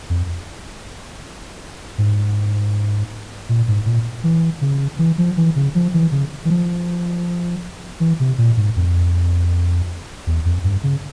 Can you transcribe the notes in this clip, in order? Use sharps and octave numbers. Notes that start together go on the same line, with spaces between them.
F2
G#2
A#2
G#2
A#2
E3
C#3
E3
F3
E3
C#3
F3
E3
C#3
E3
F3
E3
C3
A#2
G#2
F2
E2
F2
G2
C#3